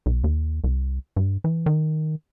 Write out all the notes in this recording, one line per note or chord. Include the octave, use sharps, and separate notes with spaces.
B1
D#2
C2
G2
E3
D#3